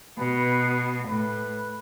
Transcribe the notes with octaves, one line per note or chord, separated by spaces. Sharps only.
B2 B4
A2 B4